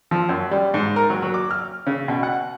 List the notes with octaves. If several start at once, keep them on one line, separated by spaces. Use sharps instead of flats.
F3
F#2
G3
G#2
A#4
F#3
F#3
D6
F6
C#3
B2
F#5